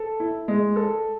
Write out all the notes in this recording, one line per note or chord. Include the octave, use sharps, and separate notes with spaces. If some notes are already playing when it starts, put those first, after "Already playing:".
Already playing: A4
E4
G#3
A4